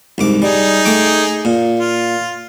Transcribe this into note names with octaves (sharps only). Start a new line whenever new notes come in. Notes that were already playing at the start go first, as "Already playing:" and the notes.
C2 G#2 D6
G3 D#4 G#4
A3 G5 D6
A#2
F4